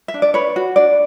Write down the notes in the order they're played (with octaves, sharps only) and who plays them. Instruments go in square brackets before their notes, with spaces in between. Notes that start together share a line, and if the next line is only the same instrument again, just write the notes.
[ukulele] E5
D4
D5
B4 C#5
F#4
D4 D5